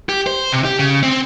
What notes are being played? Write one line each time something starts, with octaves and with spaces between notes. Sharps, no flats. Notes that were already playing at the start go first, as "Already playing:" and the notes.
G4
C5
C3
G4
C#3
C4